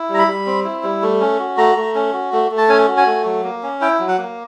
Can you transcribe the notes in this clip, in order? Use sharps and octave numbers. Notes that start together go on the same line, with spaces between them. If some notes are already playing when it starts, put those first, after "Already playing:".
Already playing: E4
G3 A#5
B5
G3
C4
E4
G3
A3
C#4
F#4
A3 A#5
A3
C#4
F#4
A3
A3
A5
C#4 G#5
F#4
G#5
A3
F#3
A#3
C#4
E4 G5
F#3
F#5
A#3